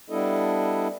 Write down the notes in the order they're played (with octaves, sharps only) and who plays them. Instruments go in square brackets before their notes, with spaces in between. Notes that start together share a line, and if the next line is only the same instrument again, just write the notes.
[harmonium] G3 B3 D4 E4 A4 D#5